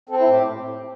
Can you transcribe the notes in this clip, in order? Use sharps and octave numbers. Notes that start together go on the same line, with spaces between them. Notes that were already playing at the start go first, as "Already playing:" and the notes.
C4 A4
E4
A2
G4
A2